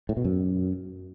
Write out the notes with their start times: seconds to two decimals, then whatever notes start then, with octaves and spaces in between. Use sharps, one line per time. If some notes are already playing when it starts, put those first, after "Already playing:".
0.09 A2
0.17 B2
0.24 F#2